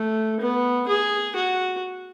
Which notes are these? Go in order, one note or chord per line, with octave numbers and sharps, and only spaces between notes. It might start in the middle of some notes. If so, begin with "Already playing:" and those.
Already playing: A3
B3
G#4
F#4